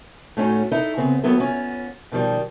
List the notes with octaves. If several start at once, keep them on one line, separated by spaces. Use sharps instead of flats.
A2 A3 C#4 D#4 F#4
D#4 E4 A4
C#3 B3 C4
D#2 F#3 B3 E4 A4
B3 C#4 F4
B2 D#3 F3 G3